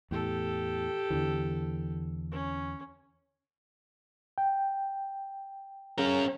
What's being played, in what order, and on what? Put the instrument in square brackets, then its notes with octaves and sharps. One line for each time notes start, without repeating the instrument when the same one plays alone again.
[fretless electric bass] E2 A2 [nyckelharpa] G4 A4
[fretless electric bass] E2 D3 E3
[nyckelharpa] C#4
[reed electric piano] G5
[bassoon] C#3 [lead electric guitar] C#4 A#4